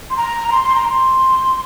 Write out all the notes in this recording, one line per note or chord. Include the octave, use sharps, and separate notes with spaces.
C6
A#5
A#5
C6
C6
A#5
C6